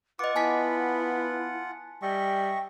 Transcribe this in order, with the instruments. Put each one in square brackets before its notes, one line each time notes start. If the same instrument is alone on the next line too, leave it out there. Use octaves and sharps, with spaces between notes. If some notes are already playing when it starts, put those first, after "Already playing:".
[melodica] F4 F#5 [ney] B4 [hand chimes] D#5 D6
[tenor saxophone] B3 [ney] E4 [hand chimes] G#5 A5 B6
[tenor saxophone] G3 [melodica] D#5 E5 C#6 [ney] G5